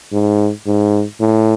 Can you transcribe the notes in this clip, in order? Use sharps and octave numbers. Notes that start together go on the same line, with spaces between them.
G#2
G#2
A2